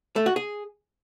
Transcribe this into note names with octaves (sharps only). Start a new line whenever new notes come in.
A3
F#4
G#4